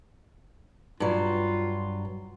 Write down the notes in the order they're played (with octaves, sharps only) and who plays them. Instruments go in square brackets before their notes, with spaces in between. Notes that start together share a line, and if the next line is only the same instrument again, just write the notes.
[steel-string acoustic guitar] G2 F#3 [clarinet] F4